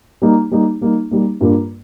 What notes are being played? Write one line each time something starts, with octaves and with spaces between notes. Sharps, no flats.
G3 A#3 D#4
G3 A#3 D#4
G3 A#3 D#4
G3 A#3 D#4
G2 G3 A#3 F4 A#4